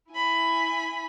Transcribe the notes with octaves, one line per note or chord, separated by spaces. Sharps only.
E4 G#5 B5